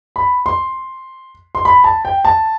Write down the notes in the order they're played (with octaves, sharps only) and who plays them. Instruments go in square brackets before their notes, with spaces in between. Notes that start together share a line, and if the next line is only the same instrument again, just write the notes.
[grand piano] B5
C6
C6
B5
A5
G5
A5